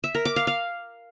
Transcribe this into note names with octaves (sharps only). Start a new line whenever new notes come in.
E5
A#4
D6
F5
F5